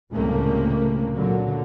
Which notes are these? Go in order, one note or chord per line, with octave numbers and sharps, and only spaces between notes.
C#2 A2 C3 G3 A3 A#3
A#2 D3 F#3